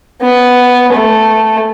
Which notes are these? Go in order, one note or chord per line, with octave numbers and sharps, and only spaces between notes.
B3
A3